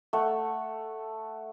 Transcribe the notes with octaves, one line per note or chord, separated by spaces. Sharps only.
A3 F#5